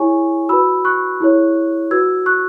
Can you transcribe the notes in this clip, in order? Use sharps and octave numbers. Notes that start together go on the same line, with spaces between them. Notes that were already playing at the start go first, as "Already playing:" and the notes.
Already playing: E4 G#4 C#5 G#5 C#6
F#4 B4 B5 E6
C#6 F#6
E4 G#4 C#5
F#4 B4 E6 G#6
C#6 F#6